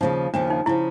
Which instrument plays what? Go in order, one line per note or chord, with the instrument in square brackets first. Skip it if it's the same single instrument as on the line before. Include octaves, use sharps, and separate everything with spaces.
[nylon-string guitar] D#2 C#3 F3 [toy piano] D#4
[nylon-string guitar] D#2 C#3 F3 [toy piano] D4
[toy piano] D#4
[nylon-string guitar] C#3 F3 [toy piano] E4